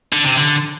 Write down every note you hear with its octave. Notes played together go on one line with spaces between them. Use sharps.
D3
C3
D3